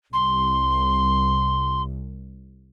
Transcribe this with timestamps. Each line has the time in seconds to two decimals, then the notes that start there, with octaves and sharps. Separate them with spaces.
0.13 C2 C6